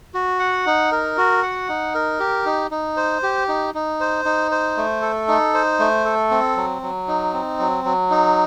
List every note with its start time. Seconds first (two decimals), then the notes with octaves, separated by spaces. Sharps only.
0.14 F#4
0.40 F#5
0.66 D#4
0.92 A#4
1.17 F#4
1.43 F#5
1.69 D#4
1.95 A#4
2.20 G4
2.46 D#4
2.71 D#4
2.97 C5
3.23 G4
3.48 D#4
3.75 D#4
4.00 C5
4.25 D#4
4.51 C5
4.77 A3
5.02 A4
5.28 D#4
5.54 C5
5.80 A3
6.05 A4
6.31 C4
6.57 F#3
6.82 F#3
7.08 D#4
7.34 C4
7.59 F#3
7.85 F#3
8.10 D#4